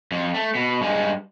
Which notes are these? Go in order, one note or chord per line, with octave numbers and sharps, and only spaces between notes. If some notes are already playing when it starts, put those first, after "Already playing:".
F2
A3
B2
G2 G#3